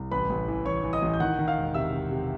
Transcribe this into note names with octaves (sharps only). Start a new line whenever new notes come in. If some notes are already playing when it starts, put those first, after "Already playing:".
Already playing: C2
A1 B4 B5
A1
E3
E3 C#5 C#6
E3
D#5 D#6
A1
G6
D#3 F#5 F#6
D#3
F5 F6
E1
C3 E5 E6
C3
C3